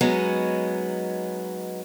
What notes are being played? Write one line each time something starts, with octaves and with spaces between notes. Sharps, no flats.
F#3 G#3 B3 C#4 D#4